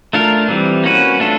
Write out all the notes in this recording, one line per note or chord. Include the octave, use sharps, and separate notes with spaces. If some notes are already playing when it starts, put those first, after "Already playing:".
A3 D4 F4 A#4
E3 G3 C4
A#3 C#4 F#4 B4
A3 D4 F4 A4